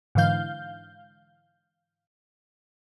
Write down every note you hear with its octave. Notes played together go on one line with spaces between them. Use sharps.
G#2 D3 E3 F5 G6